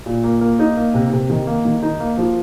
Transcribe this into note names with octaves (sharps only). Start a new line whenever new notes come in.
A#2
A#3
A#3
D#4
A#3
C3
C3
D#3
A#3
D#3
D#4
A#3
F3